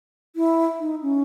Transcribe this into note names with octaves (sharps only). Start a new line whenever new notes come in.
E4
D#4
C#4